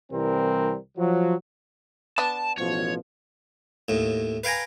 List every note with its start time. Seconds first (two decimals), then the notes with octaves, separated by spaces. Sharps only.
0.12 C2 E3 G3 C4 A#4
0.97 F3 F#3
2.18 B3 D4 A5
2.58 A1 B2 F3 C#5
3.89 D#2 A2
4.44 B4 F5 G5 G#5 A#5